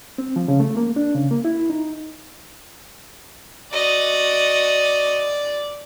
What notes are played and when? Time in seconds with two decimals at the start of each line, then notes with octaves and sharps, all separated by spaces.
0.18 C4
0.36 F3
0.48 C#3
0.60 A3
0.77 A#3
0.96 D4
1.15 C#3
1.31 A#3
1.45 E4
1.70 D#4
3.73 F#4 D5 D#5